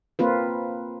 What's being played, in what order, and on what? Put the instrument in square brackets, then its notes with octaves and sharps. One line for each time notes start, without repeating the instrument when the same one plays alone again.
[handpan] A#3 C4 F4 B4